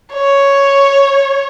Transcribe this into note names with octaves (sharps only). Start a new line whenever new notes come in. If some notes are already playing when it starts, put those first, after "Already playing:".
C#5